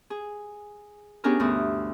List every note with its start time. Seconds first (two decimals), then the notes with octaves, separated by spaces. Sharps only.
0.10 G#4
1.24 B3 C#4 D4 G4 G#4 A#4
1.40 D2 G2 E3 B3 F#4 D#6